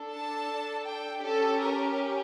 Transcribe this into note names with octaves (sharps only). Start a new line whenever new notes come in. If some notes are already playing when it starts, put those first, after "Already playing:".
Already playing: D4 A4
A5
G5
C#4 G4 A4
A#4